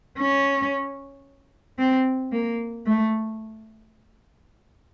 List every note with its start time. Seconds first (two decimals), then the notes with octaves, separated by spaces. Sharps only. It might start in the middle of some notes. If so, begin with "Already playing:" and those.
0.19 C#4
1.78 C4
2.32 A#3
2.86 A3